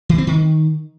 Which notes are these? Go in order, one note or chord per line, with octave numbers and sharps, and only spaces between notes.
E3
C4
D#3